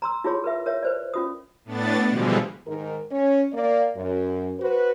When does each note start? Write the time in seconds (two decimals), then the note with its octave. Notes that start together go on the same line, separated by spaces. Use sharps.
0.02 A#5 C6 E6
0.24 E4 F4 G#4 C#5 C6
0.44 A#4 B4 E5
0.66 A#4 C#5 E5
0.82 B4 C5 D5
1.14 C#4 F4 D#6
1.65 A2 B3 D4 A6
2.08 B2 D3 E3 F3 G3 G#3
2.67 G#2 D#3 A#4
3.11 C#4 C#5
3.53 A#3 D5
3.96 F#2
4.60 F#4 B4 C5